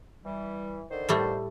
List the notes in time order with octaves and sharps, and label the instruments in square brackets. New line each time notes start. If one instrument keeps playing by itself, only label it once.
[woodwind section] E3 G3
D3 D#3 C5
[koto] A2 G3 A3